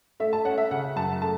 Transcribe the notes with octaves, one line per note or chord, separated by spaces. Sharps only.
A3 E5
A5
C#4 F#5
E5
C#3 F#5
F#2 A5
A3 A5